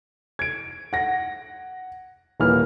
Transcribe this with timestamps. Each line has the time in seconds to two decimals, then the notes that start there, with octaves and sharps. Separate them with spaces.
0.39 G#6 D7
0.93 F#5 A#6
2.40 D#1 E3 A#3 B4 F6